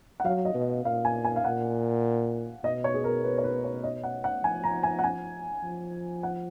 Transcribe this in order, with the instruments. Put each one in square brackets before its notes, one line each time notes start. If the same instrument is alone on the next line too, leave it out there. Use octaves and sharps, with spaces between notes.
[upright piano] F#5
[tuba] F#3 [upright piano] F5
[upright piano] D#5
[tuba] B2
[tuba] A#2 [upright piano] F5
[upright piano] G#5
G#5
F5
[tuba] A#2 [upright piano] F#5
[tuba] B2 [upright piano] D#5
[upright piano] C#5
G#4
A#4
B4
C#5
B4
C#5
D#5
F#5
F#5
[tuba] F3 [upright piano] G#5
[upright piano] A#5
G#5
F#5
G#5
[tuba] F3
[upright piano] F#5